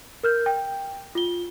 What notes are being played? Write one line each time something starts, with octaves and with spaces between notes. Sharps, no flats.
A#4 F6 G6
G5
F4 G7